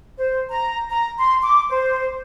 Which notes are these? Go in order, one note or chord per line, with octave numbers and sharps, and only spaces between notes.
C5
A#5
A#5
C6
D6
C5